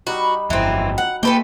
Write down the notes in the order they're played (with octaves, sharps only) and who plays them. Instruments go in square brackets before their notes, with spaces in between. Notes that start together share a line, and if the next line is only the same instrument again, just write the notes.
[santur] G3 D#4 B5 [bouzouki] F#4
[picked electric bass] G1 F2 [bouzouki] E3 C4
[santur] F#3
[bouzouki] F#5
[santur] A3 G#5 C6 [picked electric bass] A#3 [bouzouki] A4 B4 G5